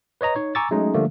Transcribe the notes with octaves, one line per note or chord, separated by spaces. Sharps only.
B4 C#5 D#5 A#5
D#4 C#5
G#5 A#5 C#6 D6 E6 A6
F#3 G#3 A3 C#4 D#4
D3 F3 G3 A3 A#3